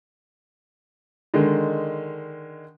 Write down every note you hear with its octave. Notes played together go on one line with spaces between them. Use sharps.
D3 D#3 G#3